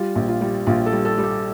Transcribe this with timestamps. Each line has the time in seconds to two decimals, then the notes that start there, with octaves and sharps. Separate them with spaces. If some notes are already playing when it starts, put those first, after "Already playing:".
Already playing: G3 F4
0.16 A#1
0.28 F4
0.41 G3
0.66 A#1 F4
0.86 A4
0.92 G3
1.05 A4
1.18 G3
1.24 G4